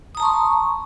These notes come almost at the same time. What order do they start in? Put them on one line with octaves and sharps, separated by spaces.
D#6 A#5 A5 C#6 C6